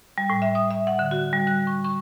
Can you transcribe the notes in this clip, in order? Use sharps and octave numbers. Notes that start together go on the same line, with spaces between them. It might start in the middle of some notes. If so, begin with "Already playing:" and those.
G3
A2
E5
D#6
E5
F#5
D3
F#4
G3
F#6
C#6
C#6